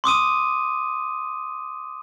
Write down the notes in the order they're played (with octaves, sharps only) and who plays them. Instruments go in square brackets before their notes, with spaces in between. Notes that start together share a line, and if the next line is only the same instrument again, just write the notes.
[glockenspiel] C6 D6 D#6 D#7